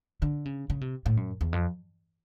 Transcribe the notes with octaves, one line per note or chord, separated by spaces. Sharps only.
D3
C#3
C#3
C3
A2
F#2
E2
F2